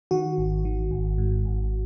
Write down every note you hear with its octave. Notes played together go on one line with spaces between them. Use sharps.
D#3 F#4
G#1
D#3
G#1
G#2
G#1